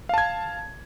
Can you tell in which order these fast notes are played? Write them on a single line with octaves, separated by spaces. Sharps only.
F5 A5 G#6